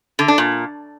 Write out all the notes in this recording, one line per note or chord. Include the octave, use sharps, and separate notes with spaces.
D3
D4
A#2